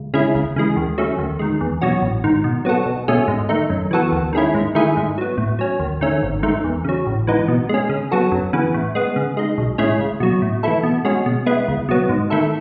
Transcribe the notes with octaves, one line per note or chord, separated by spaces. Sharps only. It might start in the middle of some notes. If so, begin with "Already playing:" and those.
Already playing: C#2
C#3 G#3 C#4 E4
C#2
C#3 E3 G#3
D#2
C#3 F#3 A3
D#2
D#3 G#3
E2
B2 F#3 C#4 F#4
A1
G#2 D#3
B2
F#3 B3 F#4 A4
B1
B2 A3 C#4 G#4
G#2
D#3 A3 D#4
F#2
E3 B3 F#4 A4
D#2
D#3 G#3 C#4 E4
G#2
D#3 A3 E4 G#4
G#2
F#3 B3
A2
F#3 C#4
D#2
D#3 A3 C#4
G#1
G#2 D#3 A3
E2
C#3 F#3
A1
G#2 E3 B3 D#4
B2
G#3 C#4
C#3
F#3 B3 F#4 A4
F#2
C#3 E3 B3
A2
G#3 B3
C#3
G#3 D#4
B1
A2 G#3 C#4 E4
C#2
B2 F#3
A2
E3 A3 E4 A4
B2
G#3 C#4 F#4
B2
G#3 B3 E4
C#2
B2 F#3 B3
G#2
D#3 A3 E4 A4